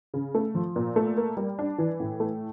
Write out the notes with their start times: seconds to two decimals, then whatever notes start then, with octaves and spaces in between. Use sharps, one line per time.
0.14 C#3
0.35 A3
0.55 F3
0.76 A#2
0.96 A3
1.17 A#3
1.37 G3
1.59 D4
1.78 E3
2.00 A2
2.20 A3